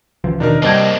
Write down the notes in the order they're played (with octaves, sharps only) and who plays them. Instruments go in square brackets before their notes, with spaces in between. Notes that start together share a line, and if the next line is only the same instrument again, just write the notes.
[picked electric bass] C#2 E3 F3
[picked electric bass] E2 B2 D#3 [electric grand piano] D4 D#4 A#4
[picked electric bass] C3 G3 [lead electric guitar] A#3 C4 [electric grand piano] D#5 [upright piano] A5 G#6